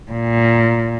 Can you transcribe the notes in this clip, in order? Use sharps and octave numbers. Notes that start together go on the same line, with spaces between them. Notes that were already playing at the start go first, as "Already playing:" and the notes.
A#2